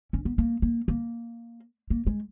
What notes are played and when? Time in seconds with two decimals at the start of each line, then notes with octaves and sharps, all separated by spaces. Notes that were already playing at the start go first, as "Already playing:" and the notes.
0.13 C#4
0.25 B3
0.38 A#3
0.62 A#3
0.88 A#3
1.90 A#3
2.07 G#3